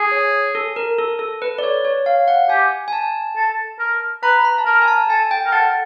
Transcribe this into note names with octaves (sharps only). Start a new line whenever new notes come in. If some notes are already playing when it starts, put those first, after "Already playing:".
Already playing: G#4
C#5
A4
A#4
A4
A4
B4
D5
C#5
C#5
F5
F#5
G4 G#5
G#5
A5
A4
A#4
B4 A#5
B5
A5
A#4 A#5
G#5
A5
A4 G#5
G5
A#4
A4 F#5